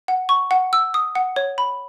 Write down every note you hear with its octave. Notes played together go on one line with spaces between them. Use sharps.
F#5
C#6
F#5
E6
D#6
F#5
C#5
B5